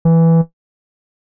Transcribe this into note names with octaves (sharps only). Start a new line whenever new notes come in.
E3